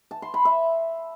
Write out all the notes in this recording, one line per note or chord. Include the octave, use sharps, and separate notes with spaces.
A5
C6
B5
E5